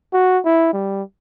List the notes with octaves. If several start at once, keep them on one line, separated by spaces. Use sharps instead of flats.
F#4
E4
G3